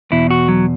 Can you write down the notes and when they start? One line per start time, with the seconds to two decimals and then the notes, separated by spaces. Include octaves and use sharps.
0.12 E2 B2 E4
0.31 F#4
0.48 F#3